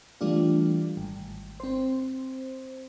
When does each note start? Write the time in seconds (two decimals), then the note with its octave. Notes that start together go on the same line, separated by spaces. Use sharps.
0.21 E3 G3 A3 D4 F4
0.97 G#1
1.60 C4 C5